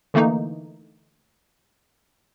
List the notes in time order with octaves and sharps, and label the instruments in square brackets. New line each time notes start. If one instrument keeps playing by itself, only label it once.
[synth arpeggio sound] D3 E3 A3 A#3 D#4